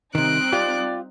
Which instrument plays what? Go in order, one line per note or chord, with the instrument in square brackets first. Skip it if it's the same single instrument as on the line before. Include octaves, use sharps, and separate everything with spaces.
[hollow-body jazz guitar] C3 D#3 [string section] G3 C4 D#4 [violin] F#6 D7
[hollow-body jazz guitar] F4 G4 [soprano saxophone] D5